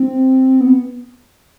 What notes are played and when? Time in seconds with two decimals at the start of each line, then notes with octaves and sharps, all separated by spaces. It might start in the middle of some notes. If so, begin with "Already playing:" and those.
Already playing: C4
0.61 B3